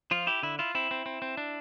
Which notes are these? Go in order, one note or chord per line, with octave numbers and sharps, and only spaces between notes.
F3 F4
E4 G4
D3 E4
E4 F4
C4 E4
C4
C4
C4
D4